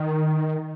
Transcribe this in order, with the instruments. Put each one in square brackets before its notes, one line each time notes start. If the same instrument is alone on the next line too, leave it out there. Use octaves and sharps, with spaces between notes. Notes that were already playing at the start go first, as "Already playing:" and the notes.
Already playing: [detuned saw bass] D#3